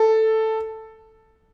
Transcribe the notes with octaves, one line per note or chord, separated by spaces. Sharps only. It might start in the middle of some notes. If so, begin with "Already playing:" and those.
Already playing: A4